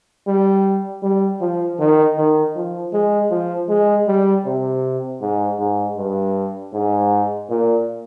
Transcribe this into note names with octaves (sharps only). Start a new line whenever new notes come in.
G3
G3
F3
D#3
D#3
F3
G#3
F3
G#3
G3
C3
G#2
G#2
G2
G#2
A#2